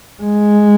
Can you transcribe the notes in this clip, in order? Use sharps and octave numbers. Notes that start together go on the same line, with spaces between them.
G#3